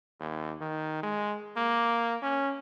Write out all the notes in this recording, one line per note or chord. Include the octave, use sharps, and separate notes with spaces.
D#2
D#3
G#3
A#3
C#4